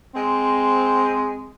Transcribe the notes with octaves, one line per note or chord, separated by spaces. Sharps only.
G#3 C4